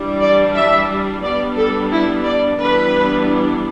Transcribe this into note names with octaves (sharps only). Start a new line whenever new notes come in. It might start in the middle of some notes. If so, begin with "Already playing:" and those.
Already playing: E3 G3 D4
D5
E5
G3 B3 D4 D5
A4
E4
D5
E3 G3 B3 D4 B4